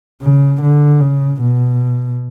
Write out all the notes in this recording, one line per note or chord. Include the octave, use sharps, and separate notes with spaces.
C#3
D3
C#3
B2